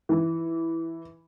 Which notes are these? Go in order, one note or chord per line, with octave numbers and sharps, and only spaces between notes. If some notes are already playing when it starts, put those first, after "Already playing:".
E3